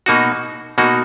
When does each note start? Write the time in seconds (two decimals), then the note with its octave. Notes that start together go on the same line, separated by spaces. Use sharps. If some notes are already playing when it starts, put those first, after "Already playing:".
0.06 B2 A#3 D#4 F#4
0.78 B2 A#3 D#4 F#4